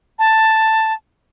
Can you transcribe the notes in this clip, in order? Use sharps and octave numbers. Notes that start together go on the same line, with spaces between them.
A5